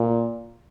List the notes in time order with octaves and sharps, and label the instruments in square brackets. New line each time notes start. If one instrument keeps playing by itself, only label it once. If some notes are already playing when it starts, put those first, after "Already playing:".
Already playing: [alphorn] A#2